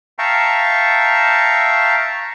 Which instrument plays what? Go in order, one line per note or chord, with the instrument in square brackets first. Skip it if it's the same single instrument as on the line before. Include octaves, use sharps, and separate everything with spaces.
[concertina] E5 F5 G5 A5 A#5 C#6